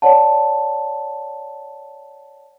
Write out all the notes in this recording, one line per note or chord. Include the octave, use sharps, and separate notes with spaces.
C#5 D5 F#5 A5